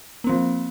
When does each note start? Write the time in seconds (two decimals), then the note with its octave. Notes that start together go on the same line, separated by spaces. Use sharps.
0.24 A#3
0.27 C4
0.29 F3